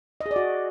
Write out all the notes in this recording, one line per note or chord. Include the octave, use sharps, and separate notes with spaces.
D#5
G#4
D5
F#4